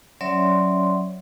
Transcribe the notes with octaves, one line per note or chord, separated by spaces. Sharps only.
F#3 C#4 C#5 D5 E5 C6